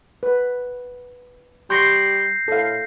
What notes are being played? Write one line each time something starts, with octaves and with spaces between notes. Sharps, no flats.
B4
G3 C6 C#6 G6 A#6 C7
A2 A4 F5